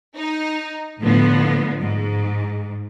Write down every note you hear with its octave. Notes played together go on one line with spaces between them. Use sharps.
D#4
A2 D3 F3 B3
G#2